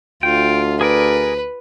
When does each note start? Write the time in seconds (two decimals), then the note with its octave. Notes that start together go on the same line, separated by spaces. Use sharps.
0.23 D2 F4 G5
0.81 G#4 A#4 B4 D5